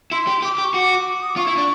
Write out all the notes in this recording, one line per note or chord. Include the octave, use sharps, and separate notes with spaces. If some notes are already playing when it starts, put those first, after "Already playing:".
E4 C6
G4
G4 D6
G4
C#6
F#4 D6
D#6
D6
F4 C#6
E4
D4